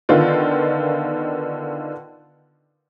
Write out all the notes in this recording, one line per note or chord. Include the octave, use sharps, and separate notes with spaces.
D3 D#3 B3 F4